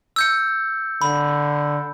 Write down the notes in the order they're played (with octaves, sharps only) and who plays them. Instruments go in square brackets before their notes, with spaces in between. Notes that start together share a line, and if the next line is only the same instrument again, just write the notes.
[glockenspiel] E6 G6 C#7
[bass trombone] D3 [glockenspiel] B5